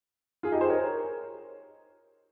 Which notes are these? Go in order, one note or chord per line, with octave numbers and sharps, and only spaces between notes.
F4 G#4
D#4 G4
G#4 C5
A#4 C#5